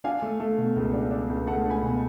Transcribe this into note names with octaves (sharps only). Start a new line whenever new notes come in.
D4 F5 G#5
A3
A3
B2
C#2
D4
D4
C#2
A3 F#5 A5
D4
G#5 B5
B2